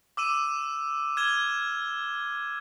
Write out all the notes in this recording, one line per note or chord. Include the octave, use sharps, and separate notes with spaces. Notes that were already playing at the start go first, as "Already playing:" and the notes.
D6 E6 D#7 E7
F6 G#6 E7 G7